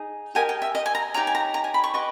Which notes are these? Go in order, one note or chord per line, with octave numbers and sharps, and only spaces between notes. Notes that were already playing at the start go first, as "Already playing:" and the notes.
Already playing: D#4 G#4
G4 A#4 D#5 G#5
G5
E5
D#5
G#5
A#5
D#4 G4 C#5 A#5
G#5
A#5
A#5
G#5
B5
C#6
G4 B4 D#5 C#6